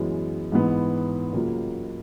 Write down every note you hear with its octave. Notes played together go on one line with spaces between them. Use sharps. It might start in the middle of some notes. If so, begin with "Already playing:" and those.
Already playing: F#2 E3 G#3 B3
G#2 E3 B3
C#2 C#3 F#3 A#3